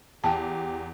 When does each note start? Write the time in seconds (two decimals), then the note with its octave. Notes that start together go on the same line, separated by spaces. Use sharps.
0.24 E2 G4 G5 A5